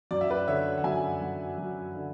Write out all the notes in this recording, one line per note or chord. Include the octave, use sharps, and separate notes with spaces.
F#2 D5
E5
B4 D5
D3 C#5 E5
F#5
F#2 E5 G#5
F#3
F#2
D3